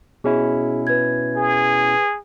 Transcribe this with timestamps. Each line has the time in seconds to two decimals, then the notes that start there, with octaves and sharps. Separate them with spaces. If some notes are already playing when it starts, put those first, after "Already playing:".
0.24 B2 C#4 E4 G#4
0.87 B4 G#6
1.36 G#4